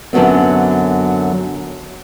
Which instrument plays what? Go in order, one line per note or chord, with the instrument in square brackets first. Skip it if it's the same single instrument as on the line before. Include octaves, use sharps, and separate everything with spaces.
[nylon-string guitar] F#2 D3 F#3 B3 C4